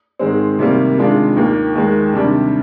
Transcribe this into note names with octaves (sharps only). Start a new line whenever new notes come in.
G#2 D#3 G#3 C4
C3 D#3 G3 A#3
C3 D#3 G#3 D4 F4
D#2 D#3 A#3
D#2 D#3 G#3
C3 D#3 G3 D4